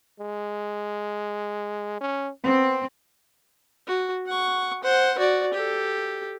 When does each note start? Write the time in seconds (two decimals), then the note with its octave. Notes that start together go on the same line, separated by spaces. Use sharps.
0.20 G#3
2.01 C#4
2.44 B3 C4
3.87 F#4
4.26 F#5 C#6
4.83 C5 F#5
5.18 F#4 D5
5.53 G4 A4